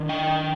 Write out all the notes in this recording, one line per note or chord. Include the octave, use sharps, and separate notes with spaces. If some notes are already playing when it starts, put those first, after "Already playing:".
Already playing: D#3 D4
D#5 G5